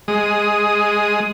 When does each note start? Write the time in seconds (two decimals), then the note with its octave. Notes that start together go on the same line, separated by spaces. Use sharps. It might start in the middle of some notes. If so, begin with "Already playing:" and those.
0.08 G#3 D#6